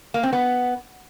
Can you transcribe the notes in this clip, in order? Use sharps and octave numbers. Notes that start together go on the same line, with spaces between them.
A#3
C4
B3